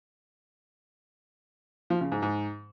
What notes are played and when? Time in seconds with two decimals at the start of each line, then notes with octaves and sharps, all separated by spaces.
1.90 F3
2.01 C#3
2.12 G#2
2.22 G#2